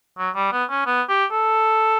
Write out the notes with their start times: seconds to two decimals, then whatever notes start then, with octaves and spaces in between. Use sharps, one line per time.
0.18 F#3
0.36 G3
0.52 B3
0.70 C#4
0.86 B3
1.09 G4
1.31 A4